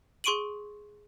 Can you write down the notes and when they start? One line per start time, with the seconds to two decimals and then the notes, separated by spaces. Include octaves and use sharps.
0.24 G#4 C6 C#6 D7 D#7 F#7